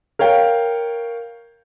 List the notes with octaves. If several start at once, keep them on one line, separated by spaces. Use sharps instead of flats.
A#4 C#5 F5 G5